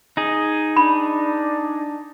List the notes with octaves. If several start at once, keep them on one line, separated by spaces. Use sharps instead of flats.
D#4 G#4
D4 B5